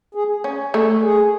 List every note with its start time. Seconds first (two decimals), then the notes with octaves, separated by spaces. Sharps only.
0.15 G#4
0.44 C#4
0.74 A3
1.03 G#4